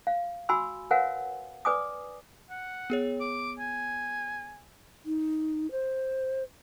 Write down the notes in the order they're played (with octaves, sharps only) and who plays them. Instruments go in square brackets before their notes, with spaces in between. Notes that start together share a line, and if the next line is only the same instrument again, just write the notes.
[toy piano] F5
F#4 G#5 B5 C6 E6
A#4 B4 C#5 F5 F#5 G#5
B4 D5 G#5 D6 D#6
[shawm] F#5
[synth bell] B3 G#4 C#5
[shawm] D6
G#5
[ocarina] D#4
C5